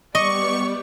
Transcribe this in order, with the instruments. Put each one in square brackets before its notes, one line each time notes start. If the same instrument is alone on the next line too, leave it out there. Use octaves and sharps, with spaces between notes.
[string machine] G3 B3 G4 [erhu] D5 [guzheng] D#5 [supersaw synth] C#6